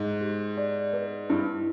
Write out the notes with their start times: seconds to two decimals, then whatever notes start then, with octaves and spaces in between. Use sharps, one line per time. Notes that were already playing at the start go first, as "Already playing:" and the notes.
Already playing: G#2
0.21 G4
0.57 D5
0.93 B4
1.30 G2 E4